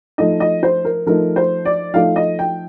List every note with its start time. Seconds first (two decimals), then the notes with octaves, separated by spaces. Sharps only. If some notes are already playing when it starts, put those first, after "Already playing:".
0.18 F3 A3 D#4 D#5
0.40 D#5
0.63 C5
0.85 A#4
1.06 F3 A3 D#4 A#4
1.36 C5
1.65 D5
1.94 F3 A3 D#4 F5
2.16 D#5
2.39 G5